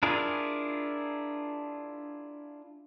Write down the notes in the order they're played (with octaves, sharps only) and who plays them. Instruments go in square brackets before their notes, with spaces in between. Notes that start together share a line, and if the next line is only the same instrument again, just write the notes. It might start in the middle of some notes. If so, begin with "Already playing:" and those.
[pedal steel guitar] D4 E4 F4 G#4 A#4